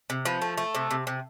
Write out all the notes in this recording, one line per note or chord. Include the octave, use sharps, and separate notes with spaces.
C3
F3 B3
A3
A3
C3
C3
C3